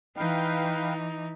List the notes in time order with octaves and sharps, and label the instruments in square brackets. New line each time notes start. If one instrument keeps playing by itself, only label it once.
[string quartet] E3 D#4 [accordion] B4 F5 G5